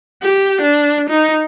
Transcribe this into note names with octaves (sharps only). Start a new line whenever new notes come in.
G4
D4
D#4